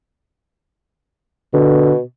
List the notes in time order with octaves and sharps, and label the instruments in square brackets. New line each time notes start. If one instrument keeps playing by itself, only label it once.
[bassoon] B2 [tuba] D3